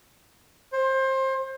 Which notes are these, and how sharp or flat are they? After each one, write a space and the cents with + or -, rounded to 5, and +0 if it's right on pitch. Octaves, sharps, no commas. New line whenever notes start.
C5 +25